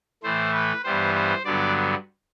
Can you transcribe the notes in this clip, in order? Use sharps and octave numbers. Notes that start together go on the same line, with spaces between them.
A2 E3 A3 C5
B4
G2 E3 G3 B3 C5
C5
G2 D3 F#3 B3 D5